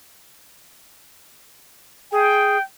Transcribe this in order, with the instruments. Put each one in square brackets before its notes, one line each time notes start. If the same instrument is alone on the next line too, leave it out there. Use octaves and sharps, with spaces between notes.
[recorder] G#4 [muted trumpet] G5